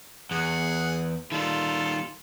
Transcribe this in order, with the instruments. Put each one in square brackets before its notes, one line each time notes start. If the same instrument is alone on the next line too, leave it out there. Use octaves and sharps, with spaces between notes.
[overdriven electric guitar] E2 [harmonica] G#4 F#5
[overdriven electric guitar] D#3 G3 [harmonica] F4 A4